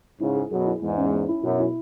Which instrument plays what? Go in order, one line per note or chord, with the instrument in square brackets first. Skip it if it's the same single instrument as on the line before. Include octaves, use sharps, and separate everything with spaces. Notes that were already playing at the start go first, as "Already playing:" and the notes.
[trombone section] G#2 C#3 [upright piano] E4
[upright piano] G#4
[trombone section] F#2 B2 [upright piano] G#4
[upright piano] E4
[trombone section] E2 G#2 [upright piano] G#3
[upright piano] C#4
C#4
E4
[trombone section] F#2 [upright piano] B2
[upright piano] E4